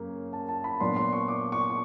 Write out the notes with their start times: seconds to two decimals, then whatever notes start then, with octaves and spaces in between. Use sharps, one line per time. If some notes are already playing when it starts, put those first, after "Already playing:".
Already playing: F#2 C#3 A#3
0.33 A5
0.49 A5
0.64 B5
0.80 A#2 F#3 B3 D4 C6
0.96 C6
1.13 C#6
1.28 D6
1.52 C#6